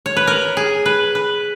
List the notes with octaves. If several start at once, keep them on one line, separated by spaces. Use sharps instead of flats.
C#5
B4
A#4
G#4
B4
B4